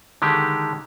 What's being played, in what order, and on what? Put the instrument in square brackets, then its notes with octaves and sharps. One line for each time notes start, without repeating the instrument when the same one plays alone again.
[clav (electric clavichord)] D3 D#3 G#3 G4